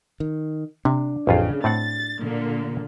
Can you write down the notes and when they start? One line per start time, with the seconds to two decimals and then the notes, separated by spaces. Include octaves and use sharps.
0.20 D#3
0.85 C3 D4
1.27 A1 F2 C#3 F4
1.64 A2 C4 F#5 A6
2.18 A#2 D3 A#3